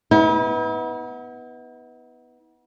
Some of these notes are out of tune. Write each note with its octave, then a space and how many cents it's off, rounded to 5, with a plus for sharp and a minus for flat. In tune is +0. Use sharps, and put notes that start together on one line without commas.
B3 +0 E4 -45